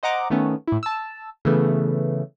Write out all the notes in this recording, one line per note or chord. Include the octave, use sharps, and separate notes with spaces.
C5 D#5 F#5 A#5 D6
D#3 A3 B3 C#4
A2 E4
A5 E6
C#3 E3 A3 B3